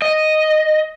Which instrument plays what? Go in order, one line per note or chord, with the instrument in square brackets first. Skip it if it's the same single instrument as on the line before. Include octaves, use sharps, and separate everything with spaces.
[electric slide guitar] D#5